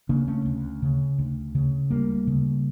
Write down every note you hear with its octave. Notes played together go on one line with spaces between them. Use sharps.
C#3 A#3 D4
A3 C#4
D2
C#3
D2
C#3
D2 G3 A#3
C#3